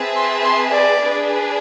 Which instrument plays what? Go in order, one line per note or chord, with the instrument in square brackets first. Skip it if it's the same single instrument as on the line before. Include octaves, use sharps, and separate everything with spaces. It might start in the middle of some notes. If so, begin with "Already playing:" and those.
Already playing: [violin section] C4 G#4 B4 E5 A5
[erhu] C6
C6
D5
[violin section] D4 G#4 B4